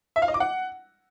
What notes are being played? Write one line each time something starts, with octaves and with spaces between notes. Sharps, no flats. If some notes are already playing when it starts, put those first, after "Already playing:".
E5
F5
D#5
D6
F#5